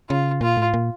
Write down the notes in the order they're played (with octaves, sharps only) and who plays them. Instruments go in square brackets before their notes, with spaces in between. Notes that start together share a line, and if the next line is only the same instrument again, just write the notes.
[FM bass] C#3 [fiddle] F4
[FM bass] A#2 [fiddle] F4
[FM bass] A2
A#2